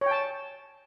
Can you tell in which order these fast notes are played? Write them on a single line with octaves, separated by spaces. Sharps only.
C#5 G5 A5